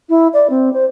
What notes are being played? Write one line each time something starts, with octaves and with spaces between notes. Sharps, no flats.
E4
D5
C4
C5